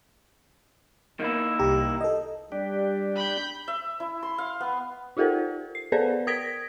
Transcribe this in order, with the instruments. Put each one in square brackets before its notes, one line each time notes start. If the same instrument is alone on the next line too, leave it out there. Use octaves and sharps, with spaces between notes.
[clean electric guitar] D#3 A#3 E4
[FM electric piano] C2 G4 A#5
A4 D#5
[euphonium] G3 [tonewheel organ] D4 G4
[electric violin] B5 G6
[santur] E5
E4
C6
F5
B3
[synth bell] D#4 F4 G4 A4 A#4 C5
C7
B3 G#4 A4 B4 C5 D5
A#4 D#6 G#6 A#6 B6 D7